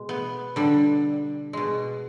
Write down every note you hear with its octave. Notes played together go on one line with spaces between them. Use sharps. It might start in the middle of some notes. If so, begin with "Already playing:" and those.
Already playing: B2 G#3
B3
D3 G3
B2 G#3